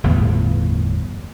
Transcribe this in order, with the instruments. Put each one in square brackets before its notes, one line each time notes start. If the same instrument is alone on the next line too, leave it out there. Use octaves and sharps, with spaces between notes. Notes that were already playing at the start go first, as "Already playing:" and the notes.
[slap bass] G1 E2 A2 B3